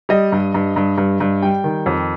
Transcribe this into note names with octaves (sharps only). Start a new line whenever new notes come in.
G3 D#5
G2
G2
G2
G2
G2
G3 G5
D#3
F2